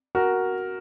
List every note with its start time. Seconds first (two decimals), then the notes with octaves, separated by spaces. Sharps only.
0.15 F#4 A#4